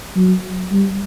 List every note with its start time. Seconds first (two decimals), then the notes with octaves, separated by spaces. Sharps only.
0.16 F#3
0.71 G3